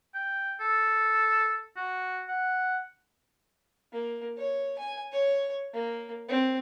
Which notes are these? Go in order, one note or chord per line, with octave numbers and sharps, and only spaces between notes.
G5
A4
F#4
F#5
A#3
C#5
G#5
C#5
A#3
C4